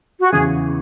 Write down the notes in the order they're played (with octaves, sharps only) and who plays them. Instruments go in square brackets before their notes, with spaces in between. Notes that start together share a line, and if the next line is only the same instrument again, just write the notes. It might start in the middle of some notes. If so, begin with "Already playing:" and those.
[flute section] F#4
[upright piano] E2 C#3 E3 [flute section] G#4